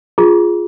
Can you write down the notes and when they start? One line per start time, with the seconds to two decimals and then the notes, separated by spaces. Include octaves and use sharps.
0.18 F4 G#4